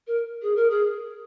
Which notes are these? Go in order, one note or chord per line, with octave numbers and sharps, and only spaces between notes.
A#4
G#4
A#4
G#4